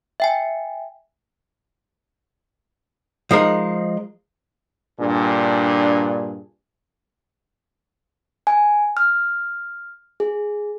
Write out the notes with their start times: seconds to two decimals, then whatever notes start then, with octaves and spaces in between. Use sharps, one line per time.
0.20 E5 G5 G#5
3.31 F3 G#3 D#4 A#4
5.00 G2 A#2 D4 G#4
8.47 G#5
8.97 F6
10.20 G#4